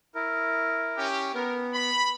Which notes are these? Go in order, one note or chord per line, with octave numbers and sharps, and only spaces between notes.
E4 A#4
C#4 G4
B3 A#4
B5